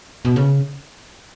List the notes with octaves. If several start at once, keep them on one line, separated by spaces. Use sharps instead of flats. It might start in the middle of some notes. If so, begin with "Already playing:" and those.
B2
C#3